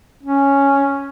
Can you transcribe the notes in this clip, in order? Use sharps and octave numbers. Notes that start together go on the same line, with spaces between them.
C#4